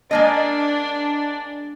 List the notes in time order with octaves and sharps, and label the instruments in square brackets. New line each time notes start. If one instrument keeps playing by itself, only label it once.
[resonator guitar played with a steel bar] G#3 A#3 D#5 [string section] D4